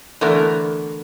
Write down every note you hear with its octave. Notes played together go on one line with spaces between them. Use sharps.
D3 E3 A3 B3 A#4